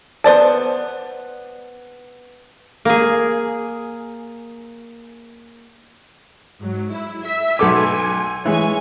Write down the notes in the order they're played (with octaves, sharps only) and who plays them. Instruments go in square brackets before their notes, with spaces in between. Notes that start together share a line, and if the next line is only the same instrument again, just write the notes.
[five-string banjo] B3 C5 D5 A5
[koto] A#3 G#4
[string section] G#2 F#3
E4
E5 B6
[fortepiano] B1 A4 D6 [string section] G#5
[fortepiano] E3 G#3 [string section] C#5 G#5